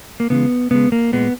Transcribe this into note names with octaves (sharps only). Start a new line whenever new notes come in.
A#3
C#3 E3 G#3 B3
C#3 G#3 B3
A#3
A#2 G#3 B3